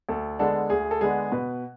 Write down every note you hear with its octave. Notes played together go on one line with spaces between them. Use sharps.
D2 A4
D3 G#3 B3 D4 A4
D2 G#4
A4
D3 G#3 B3 D4 G#4
B2 B4